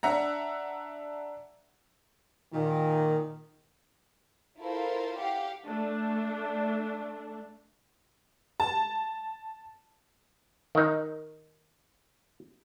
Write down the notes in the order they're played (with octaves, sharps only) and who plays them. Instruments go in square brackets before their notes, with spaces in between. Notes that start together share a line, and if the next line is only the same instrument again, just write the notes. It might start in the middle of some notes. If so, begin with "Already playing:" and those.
[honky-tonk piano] D4 E5 F#5 A#5
[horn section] A#2 D#3
[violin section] E4 F4 A4 A#4 C5
G4 F5 F#5
[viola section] A3 D4
[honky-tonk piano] A5
[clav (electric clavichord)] D#3 D#4